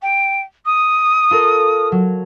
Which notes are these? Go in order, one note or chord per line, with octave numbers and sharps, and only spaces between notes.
G5
D#6
F4 A4 A#4
F#3